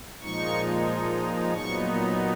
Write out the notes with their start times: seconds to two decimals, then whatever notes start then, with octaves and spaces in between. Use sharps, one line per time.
0.21 A#2 F3 G#3 D#4 C#6
1.54 A#2 F#3 B3 D#4 C#6